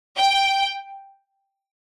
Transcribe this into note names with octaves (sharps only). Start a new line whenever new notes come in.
G5